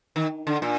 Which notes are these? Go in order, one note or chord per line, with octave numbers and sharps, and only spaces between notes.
D#3
D3
A#2